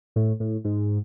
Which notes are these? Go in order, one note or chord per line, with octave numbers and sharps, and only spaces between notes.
A2
A2
G#2